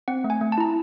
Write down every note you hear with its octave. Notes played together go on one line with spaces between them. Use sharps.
C4 F#5
A3
G#5
A3
A5
E4 A#5